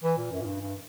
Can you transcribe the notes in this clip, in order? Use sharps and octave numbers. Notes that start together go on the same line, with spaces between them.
E3
A#2
F#2
A#2
G2
G2